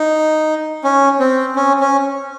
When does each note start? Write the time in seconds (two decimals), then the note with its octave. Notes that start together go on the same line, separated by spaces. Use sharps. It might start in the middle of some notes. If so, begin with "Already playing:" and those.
Already playing: D#4
0.84 C#4
1.20 C4
1.56 C#4
1.80 C#4